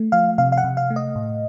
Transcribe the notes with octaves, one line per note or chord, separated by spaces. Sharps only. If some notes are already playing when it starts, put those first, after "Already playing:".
Already playing: A3
F3 F5
C3 F5
F5
F#5
C3
F5
A3
D#5
A2